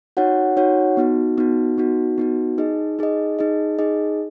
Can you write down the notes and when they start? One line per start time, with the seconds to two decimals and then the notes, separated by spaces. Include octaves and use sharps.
0.17 D#4 F#4 C#5 F#5
0.57 D#4 F#4 C#5 F#5
0.97 B3 D#4 F#4
1.38 B3 D#4 F#4
1.78 B3 D#4 F#4
2.18 B3 D#4 F#4
2.58 D#4 G#4 D#5
2.99 D#4 G#4 D#5
3.39 D#4 G#4 D#5
3.79 D#4 G#4 D#5